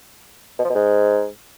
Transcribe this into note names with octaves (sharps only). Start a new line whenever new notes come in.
B2
F3
B2
G#2